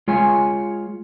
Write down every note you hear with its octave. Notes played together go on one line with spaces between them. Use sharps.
G#3 F4 C#5 G#5